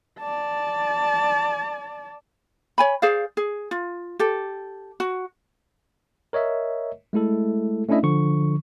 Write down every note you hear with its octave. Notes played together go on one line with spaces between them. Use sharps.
D5 A5
C#5 G#5 B5
G#4 C5 D5 F5
G#4
F4
G4 A4
F#4
A#4 C#5 D#5 E5
G#3 A3 E4 A4
A3 C#4 D4 E4 D#5 E5
D3 F3 C#6